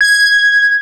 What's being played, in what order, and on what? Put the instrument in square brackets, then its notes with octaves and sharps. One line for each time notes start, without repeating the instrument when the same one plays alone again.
[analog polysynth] G#6